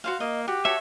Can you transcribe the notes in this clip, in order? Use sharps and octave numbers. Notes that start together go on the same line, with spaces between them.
F#4 C5 F5
A#3 D#5
F#4 G4
F#4 A4 C#5 E5